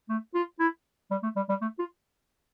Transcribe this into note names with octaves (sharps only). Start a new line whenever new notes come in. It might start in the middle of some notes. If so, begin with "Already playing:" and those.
A3
F4
E4
G3
A3
G3
G3
A3
F4